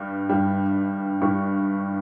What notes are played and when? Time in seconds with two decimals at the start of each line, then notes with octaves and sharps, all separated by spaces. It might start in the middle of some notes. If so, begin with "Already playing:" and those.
Already playing: G2 G3
0.29 G2 G3
1.21 G2 G3 C#6